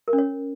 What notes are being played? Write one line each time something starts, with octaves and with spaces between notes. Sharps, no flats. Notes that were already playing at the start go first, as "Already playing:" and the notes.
A#4
C#4
C#5